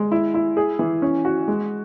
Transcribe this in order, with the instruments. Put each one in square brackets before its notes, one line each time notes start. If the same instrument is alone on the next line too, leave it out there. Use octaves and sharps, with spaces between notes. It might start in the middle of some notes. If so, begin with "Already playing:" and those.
Already playing: [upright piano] G#3
E4
E4
G#4
E3
C#4
F#4
G#3